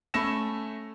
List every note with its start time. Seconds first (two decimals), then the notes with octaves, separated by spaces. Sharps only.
0.14 A3 C#4 B5 E6 A#6 E7